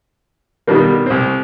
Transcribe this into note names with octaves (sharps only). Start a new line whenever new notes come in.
B2 D#3 G3 A#3
C2 C4